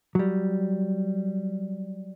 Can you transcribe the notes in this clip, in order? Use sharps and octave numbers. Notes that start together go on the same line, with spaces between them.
F#3 G3